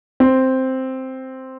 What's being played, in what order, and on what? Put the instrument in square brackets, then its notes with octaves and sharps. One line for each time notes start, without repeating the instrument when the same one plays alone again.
[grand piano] C4